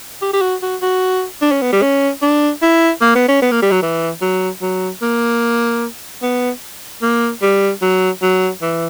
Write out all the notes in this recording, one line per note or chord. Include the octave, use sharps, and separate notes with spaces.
G4
G4
F#4
F#4
F#4
D4
C#4
B3
G3
C#4
D4
E4
A#3
B3
C#4
B3
A#3
G3
F#3
E3
F#3
F#3
A#3
B3
A#3
G3
F#3
F#3
E3